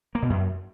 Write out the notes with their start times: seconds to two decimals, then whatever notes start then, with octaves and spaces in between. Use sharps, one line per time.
0.15 A#3
0.22 B2
0.30 F#2